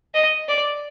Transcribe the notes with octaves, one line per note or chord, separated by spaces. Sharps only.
D#5
D5